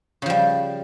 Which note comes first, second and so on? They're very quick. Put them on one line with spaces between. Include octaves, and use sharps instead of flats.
C#3 F3 G3